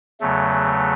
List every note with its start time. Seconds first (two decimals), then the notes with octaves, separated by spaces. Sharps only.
0.20 E2 C#3 F#3 A3